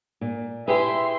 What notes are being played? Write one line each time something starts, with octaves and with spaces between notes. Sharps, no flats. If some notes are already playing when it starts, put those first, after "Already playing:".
A#2
E4 G4 G#4 B4 E5 C6